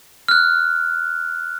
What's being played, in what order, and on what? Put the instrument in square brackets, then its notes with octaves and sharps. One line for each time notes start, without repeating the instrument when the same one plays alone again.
[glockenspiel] F6 F#6